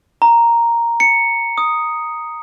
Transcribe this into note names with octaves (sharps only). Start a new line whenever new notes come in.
A#5
C#7
D#6